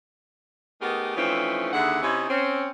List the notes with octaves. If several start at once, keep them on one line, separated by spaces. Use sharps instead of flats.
A3 B3 D#4 G4 G#4 A#4
E3 F3 A3 C4 C#4 D#4
D#2 D3 E4 G#4 F#5
C3 C#4 D#4 E4
C4 C#4